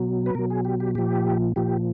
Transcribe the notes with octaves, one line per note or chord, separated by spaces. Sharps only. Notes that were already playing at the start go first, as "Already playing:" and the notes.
Already playing: B2 F#3
B4
B2 F#3 A#4
G#4
G4
G4
A#2 F3 G4
A#2 F3 G4